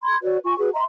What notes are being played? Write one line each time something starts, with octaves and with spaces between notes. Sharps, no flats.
B5 C6 G#6
F#4 B4 C#5 D5
F4 G#5 C#6
F#4 G#4 B4
D#5 E5 A#5 C6